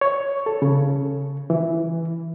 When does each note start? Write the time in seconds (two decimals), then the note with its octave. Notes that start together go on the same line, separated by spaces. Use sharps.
0.01 C#5
0.46 A4
0.62 C#3
1.50 E3